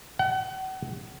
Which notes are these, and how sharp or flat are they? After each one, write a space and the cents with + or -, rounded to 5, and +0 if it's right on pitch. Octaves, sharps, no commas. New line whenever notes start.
F#5 +40